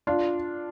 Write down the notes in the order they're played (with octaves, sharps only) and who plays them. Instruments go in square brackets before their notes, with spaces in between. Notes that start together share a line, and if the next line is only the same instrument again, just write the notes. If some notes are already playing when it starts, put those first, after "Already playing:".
[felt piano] D4 F4